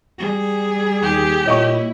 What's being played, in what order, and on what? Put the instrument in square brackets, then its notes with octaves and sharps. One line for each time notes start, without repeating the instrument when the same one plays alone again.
[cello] G3 G#4
[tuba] D#2 [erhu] G4
[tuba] A#2 [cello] E4 [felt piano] C#5 D#5 C#6